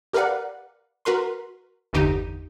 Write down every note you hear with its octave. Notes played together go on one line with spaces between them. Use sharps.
G4 A#4 B4 D5 F5 F#5
F#4 A#4 B4 C6
G1 E2 D3 D#4 G4 D#7